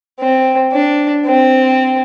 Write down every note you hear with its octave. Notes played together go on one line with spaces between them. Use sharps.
C4
D4
C4